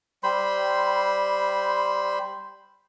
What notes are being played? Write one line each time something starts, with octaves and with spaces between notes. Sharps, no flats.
G3 C5 B5 C6